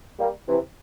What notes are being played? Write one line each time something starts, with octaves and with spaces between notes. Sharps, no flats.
G3 A#3
C3 E3